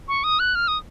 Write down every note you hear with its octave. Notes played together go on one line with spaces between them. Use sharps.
C#6
D#6
F#6
F6
D#6